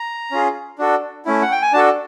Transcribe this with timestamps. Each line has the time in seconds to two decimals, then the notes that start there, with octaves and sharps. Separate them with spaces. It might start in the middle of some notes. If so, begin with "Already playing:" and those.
Already playing: A#5
0.32 C#4 F4 G#4
0.79 D4 F#4 A4
1.26 A3 C#4 E4
1.42 F#5
1.52 G5
1.62 G#5
1.73 D4 F#4 A4 A5